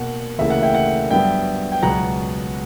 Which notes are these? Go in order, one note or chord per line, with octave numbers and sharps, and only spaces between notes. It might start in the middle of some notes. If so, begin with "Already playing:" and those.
Already playing: B2 A#3 F#5
D2 C#3 E3 A#3 E5
F#5
E5 G5
F#5
G2 F#3 B3 E5 G5
G5
C#2 B2 F#3 B3 F#5 A#5